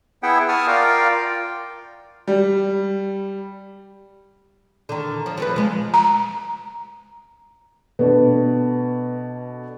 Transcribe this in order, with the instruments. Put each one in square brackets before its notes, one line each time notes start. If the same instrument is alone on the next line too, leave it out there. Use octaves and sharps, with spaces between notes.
[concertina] B3 E4 G#4 E5 F#5 G5
F#5 A5 C#6 D#6 F6
F4 A#4 D5 F5 G5
[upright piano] G3
[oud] D3 D#3
F3
F3 C4 B4
F3 G#3
[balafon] A#5
[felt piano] B2 A3 D4 [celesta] B4